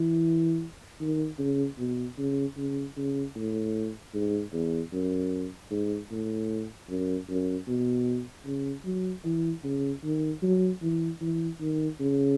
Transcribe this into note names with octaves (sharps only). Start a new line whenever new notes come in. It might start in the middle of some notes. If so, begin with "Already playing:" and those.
Already playing: E3
D#3
C#3
B2
C#3
C#3
C#3
A2
G#2
E2
F#2
G#2
A2
F#2
F#2
B2
C#3
F#3
E3
C#3
D#3
F#3
E3
E3
D#3
C#3